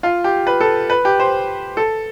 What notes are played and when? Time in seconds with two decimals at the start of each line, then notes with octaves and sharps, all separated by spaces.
0.03 F4
0.24 G4
0.47 B4
0.61 A4
0.90 B4
1.05 G4
1.19 C5
1.77 A4